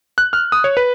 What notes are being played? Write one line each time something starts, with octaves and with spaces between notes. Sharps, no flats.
F#6
F6
D#6
C#5
B4